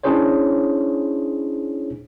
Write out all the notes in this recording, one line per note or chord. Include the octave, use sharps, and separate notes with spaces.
C#4 D4 E4 G#4 C5 C#5